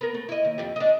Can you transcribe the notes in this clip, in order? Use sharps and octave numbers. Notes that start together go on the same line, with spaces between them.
B3 A#4
A3
E4 D#5
D#2
F2 G3
D4 D#5